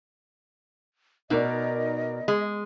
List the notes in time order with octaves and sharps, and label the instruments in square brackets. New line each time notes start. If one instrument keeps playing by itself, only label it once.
[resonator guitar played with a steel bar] B2 [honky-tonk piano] D#4 A#4 D5 [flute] D#5
[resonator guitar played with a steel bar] G#3